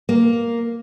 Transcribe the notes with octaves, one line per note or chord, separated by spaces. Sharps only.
A#3